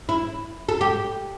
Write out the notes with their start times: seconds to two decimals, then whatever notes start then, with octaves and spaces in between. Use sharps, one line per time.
0.09 E4
0.69 A4
0.81 G4